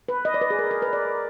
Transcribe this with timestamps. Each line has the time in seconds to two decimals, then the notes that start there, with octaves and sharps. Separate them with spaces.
0.08 B4
0.25 D#5
0.34 D5
0.42 B4
0.50 G#4
0.59 A#4
0.71 A#4
0.82 B4
0.93 D5